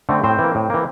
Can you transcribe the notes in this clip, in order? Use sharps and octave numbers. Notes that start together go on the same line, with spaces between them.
D3 A3 C4
A2 C4 C5
E3
A#3
A2
E3 A#3